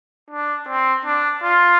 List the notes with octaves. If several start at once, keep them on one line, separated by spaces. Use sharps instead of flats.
D4
C4
D4
F4